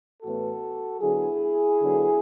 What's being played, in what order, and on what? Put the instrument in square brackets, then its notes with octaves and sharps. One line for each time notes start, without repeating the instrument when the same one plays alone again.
[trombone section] A2 E3 B3 F#4 A4
D3 F#3 B3 E4 G#4
D3 F#3 B3